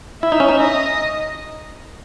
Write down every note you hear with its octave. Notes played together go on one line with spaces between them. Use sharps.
E4 E5
D#4
C#4
D#4
D#5